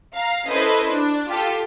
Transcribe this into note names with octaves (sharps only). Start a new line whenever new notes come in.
F5 A#5
C#4 E4 A4 B4 C5 D#5
D4
F4 G4 A4